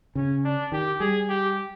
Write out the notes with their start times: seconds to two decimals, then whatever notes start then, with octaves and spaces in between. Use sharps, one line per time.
0.15 C#3 C#4
0.45 D4
0.72 D#3 G4
1.00 G3 G#4
1.29 G4